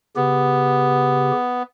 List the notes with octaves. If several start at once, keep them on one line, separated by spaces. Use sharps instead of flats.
C#3 B3 G4